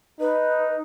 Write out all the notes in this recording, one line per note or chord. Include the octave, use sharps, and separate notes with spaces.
D#4 B4